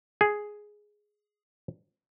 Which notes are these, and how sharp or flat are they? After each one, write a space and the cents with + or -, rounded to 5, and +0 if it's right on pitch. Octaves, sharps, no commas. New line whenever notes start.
G#4 +5